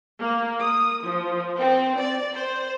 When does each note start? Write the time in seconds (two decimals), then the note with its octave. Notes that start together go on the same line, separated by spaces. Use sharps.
0.19 A#3
0.60 D#6
1.06 F3
1.58 C4
1.99 D5
2.36 C5